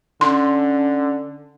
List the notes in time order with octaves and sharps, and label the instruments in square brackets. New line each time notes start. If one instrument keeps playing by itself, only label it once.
[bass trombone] D3 [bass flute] C#4 [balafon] C6